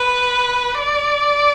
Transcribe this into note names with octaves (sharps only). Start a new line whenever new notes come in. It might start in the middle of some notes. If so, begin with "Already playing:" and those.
Already playing: B4
D5